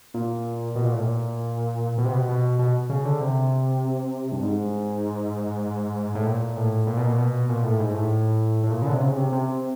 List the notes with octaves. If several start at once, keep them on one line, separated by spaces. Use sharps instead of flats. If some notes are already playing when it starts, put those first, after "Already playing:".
A#2
B2
A#2
A2
A#2
B2
C3
B2
B2
B2
C#3
D3
C3
G2
G#2
A2
A#2
A2
A#2
B2
A#2
B2
A#2
A2
G#2
A2
A2
A#2
C#3
D3
C3
C#3
C3
C3